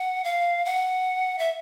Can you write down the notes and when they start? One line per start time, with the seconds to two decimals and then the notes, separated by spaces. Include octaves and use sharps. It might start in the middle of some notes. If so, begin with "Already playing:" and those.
Already playing: F#5
0.24 F5
0.65 F#5
1.39 E5